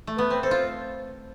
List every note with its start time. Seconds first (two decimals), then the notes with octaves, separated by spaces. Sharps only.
0.07 A3
0.17 B3 B4
0.30 C4
0.43 A4 C5
0.51 F4